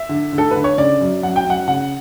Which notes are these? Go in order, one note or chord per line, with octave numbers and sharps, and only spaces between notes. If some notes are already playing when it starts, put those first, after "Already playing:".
Already playing: E5
D3
D3
A4
D3 B4
C#5
C#3 D5
F#2
F#2 F#5
G5
F#2
F#5
C#3 F#5